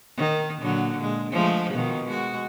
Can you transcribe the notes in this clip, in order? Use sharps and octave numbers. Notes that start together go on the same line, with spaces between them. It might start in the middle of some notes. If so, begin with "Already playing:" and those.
D#3
A#2 D3 F#3
A#2 G#3
F3 G#3 A3
B2 D#3 F3
G#3 F#4